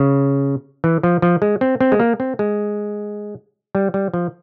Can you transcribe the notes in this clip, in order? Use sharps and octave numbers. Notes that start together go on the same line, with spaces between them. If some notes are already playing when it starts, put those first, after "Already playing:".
Already playing: C#3
E3
F3
F3
G#3
C4
C4
G#3
A#3
C4
G#3
G3
G3
F3